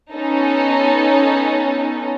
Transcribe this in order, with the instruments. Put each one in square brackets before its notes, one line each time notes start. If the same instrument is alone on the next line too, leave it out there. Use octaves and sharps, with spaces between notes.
[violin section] B3 C#4 D#4 A4